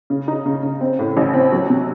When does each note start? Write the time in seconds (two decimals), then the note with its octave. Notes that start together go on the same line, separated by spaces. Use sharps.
0.10 C#3
0.28 D#4
0.46 C#3
0.63 C#3
0.81 C4
0.99 A2
1.17 A1
1.34 C4
1.52 F#3
1.70 C3